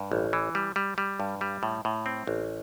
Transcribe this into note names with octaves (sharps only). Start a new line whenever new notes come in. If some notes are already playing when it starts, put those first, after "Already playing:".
Already playing: G2
A1
E3
G3
G3
G3
G2
G3
A2
A2
C4
A1